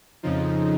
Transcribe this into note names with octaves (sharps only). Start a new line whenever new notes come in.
F2 C#3 F3 D#4